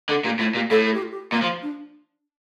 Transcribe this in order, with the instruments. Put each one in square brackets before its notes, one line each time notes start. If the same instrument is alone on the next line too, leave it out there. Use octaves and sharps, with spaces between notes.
[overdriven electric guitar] D3 [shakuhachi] A4
[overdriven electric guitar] A#2 [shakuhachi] G4
[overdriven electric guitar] A2 [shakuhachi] F4
[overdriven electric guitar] A#2 [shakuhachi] G4
[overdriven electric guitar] A2 [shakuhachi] A4
[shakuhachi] A4
G4
F4
G4
[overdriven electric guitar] A#2 [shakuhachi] A#3
[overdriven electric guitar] F3
[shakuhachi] D4